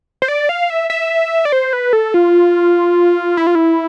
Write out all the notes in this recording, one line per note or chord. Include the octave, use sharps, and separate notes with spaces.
C5
D5
F5
E5
E5
D5
C5
B4
A4
F4
E4
F4
E4